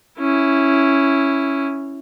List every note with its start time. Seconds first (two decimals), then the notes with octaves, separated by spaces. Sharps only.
0.19 C#4 E4